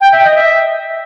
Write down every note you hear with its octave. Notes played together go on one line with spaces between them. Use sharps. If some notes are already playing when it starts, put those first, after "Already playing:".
G5
E5
D#5
E5